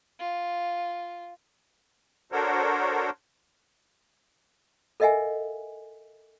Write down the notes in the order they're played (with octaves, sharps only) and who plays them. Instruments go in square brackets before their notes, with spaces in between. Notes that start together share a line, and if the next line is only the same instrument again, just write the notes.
[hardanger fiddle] F4
[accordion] D4 F#4 A4 A#4 C5 C#5
[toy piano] A4 A#4 D#5 E5 F#5 G#5